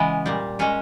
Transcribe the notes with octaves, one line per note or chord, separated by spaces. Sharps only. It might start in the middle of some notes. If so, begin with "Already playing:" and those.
Already playing: C#3 E3 G#3 B3
A#2 G3
A#2 G#3 C#4